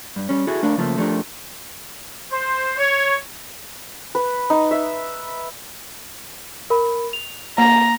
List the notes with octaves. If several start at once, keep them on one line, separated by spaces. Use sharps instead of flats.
G2
G3 C#4
E4 F#4 G#4 A4
A3 D4 A#4 F5
C#3 F3 A3 A#3 A4
F3 A3 D4 G4 A#4
C5
C#5
B4
D#4
E5
A#4 B5
F7
A#3 A#5